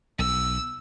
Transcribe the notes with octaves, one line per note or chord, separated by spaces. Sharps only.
B1 E6